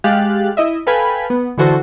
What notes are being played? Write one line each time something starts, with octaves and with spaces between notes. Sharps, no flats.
G#3 G4 F5 F#6 A6
E4 D#5 E5
A4 B4 F5 G5 G#5 B5
B3
D3 E3 E4 F#4 A4 C5